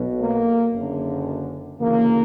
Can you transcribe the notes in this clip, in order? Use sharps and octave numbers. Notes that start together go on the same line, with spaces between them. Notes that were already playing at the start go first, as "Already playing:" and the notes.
Already playing: B1 B2
A#3
F#1 F#2 D3
D2 C#3 E3 A#3